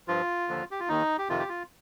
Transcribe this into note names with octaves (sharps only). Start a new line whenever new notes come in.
G2 F3 F4
D#2 D3 F3
G4
F4
D#2 D#3 D#4
G4
F2 C3 D#3 F4
G4
F4